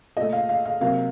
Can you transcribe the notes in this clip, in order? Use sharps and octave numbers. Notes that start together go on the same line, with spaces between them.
A#2 A3 D#5
F5
F5
F5
C3 F#3 A#3 F5